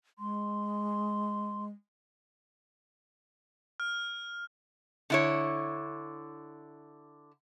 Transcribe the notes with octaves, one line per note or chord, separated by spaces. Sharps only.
G#3 C6
F6
D3 E4 C#5